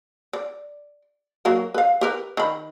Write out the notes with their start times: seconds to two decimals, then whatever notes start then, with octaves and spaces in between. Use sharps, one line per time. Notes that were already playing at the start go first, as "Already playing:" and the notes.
0.33 D5
1.45 F#3 A#3 A#4
1.74 B4 F5
2.01 G4 A#4 B4
2.37 D#3 B5